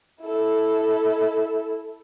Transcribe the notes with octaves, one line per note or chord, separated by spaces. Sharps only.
E4 A4